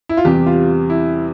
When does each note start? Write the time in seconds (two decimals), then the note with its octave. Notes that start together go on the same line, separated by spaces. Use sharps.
0.09 E4
0.17 F4
0.25 E2 C3 G3 G4
0.46 F4
0.90 E4